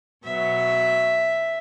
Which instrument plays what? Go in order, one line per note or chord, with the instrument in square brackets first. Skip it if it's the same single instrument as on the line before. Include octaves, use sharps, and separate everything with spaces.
[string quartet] B2 F#3 B3 E5